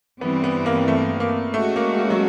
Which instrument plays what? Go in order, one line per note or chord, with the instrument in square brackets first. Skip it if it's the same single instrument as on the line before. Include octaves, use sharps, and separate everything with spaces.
[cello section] G2 E3 G3 C4 [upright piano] B3
[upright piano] B3
A#3
A3
A#3
[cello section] G#3 C#4 F#4 [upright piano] A3
[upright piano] A#3
A#3
F#3